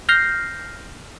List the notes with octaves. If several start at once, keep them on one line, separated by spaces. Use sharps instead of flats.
F6 G6 A#6 C7